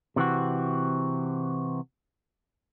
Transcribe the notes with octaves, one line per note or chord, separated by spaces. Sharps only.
C3 E3 C4 F#4